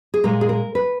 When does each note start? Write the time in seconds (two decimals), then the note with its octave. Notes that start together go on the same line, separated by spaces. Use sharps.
0.14 G#4
0.23 A#2 G#3 A#4
0.41 G#4
0.49 A#4
0.75 B4